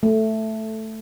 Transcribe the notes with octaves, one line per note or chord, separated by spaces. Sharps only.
A3